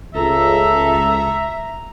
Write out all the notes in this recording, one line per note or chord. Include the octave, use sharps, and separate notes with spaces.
C#2 A4 E5 A#5